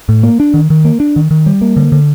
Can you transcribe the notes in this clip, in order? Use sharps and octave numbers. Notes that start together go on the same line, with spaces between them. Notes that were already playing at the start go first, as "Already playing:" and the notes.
A2
A#3
D4
D#3
D#3
A#3
D4
D#3
D#3
G3
A#3
D3
D3